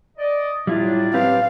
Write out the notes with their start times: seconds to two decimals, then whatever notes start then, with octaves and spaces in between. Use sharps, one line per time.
0.18 D5 D#5
0.67 A2 F#3 G3 D4 E4 F4
1.14 C4 G4 B4 F5